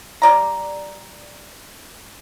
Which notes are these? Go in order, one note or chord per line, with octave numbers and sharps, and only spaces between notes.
G3 D5 A#5